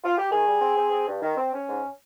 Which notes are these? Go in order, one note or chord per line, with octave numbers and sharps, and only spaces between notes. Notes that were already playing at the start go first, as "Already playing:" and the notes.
F4
G4
D#3 G#4
G3
C4
C4
C4
G2
D#3
C4
C#4
G#2